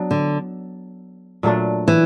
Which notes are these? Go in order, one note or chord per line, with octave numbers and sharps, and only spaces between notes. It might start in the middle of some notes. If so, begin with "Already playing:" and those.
Already playing: F#3 B3 D4
D3
A#2 F#3 A3 D4
E3